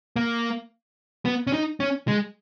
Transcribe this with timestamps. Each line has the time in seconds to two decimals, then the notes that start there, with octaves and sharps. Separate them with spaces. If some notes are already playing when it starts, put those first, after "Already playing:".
0.16 A#3
1.25 B3
1.47 C#4
1.53 D#4
1.80 C#4
2.08 G#3